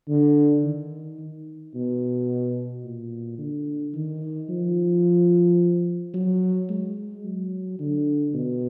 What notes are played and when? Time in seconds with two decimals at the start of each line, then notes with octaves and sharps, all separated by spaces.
0.09 D3
0.64 D#3
1.19 D#3
1.74 B2
2.84 A#2
3.38 D3
3.94 D#3
4.49 F3
6.14 F#3
6.69 G#3
7.25 F#3
7.79 D3
8.34 B2